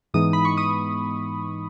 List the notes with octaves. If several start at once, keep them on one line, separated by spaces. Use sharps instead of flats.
G#2 E3 G#3 B3 D#4 D#6
B5
C#6
D#6